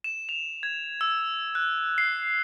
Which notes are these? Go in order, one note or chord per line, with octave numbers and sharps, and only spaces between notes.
E7
F7
G#6
E6
F#6
C7